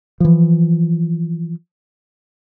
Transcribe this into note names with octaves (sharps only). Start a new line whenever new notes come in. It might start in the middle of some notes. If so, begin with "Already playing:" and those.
E3 F3